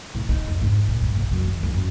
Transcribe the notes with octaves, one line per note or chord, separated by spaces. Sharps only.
A2
D#4
F2
G#2
A#2
G2
B1
F#2
D#3
F2
F#2